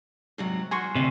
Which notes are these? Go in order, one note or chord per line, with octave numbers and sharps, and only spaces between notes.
G#2 C3 F#3
E2 F#3 F#4 G#5 C6 C#6
D2 C3 D5 D#5